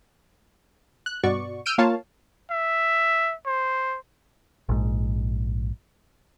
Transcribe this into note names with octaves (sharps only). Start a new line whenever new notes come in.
F#6
G2 B2 F#4 D5 C#6
E6 F6 G6 D7 D#7
A#3 F4 C#5 F5 A5
E5
C5
A#1 G#2